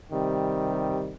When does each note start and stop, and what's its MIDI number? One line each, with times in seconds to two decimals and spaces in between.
0.12 1.15 48
0.12 1.15 51
0.12 1.15 55